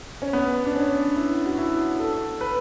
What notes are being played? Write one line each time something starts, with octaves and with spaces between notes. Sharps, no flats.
C#4
B3
D4
C#4
E4
F#4
E4
A4
B4